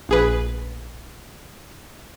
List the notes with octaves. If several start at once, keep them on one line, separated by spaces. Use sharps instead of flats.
A#1 G#4 B4